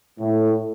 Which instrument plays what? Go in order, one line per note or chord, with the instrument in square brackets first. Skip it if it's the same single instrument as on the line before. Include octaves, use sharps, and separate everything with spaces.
[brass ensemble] A2